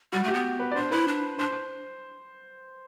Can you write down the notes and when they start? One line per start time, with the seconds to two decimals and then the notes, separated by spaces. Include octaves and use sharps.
0.12 G3 F#4
0.24 A3 G4
0.34 B3
0.60 B4
0.72 D5
0.76 D4 C5
0.91 E4 B4
1.08 D4
1.39 D4 C5